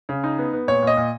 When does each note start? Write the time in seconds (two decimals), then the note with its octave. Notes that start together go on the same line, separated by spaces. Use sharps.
0.09 C#3
0.24 D#4
0.39 B3
0.53 B3
0.68 A#2 C#5
0.82 A#2
0.87 D#5
0.97 A#2